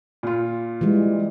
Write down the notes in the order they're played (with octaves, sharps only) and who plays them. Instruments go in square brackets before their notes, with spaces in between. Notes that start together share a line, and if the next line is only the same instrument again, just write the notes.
[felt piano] A#2 F4
[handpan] E3 G3 G#3